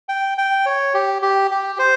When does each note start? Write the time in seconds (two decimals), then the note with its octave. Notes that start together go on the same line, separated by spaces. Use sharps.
0.09 G5
0.38 G5
0.66 C#5
0.94 G4
1.22 G4
1.51 G4
1.79 C5